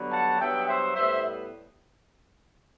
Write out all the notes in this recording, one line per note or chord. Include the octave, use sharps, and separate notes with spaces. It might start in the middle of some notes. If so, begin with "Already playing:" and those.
Already playing: G2 D3 F#3 B3
F#5 A5
G2 F#3 B3 E5 G5
C5 E5
A2 G3 B3 C5 E5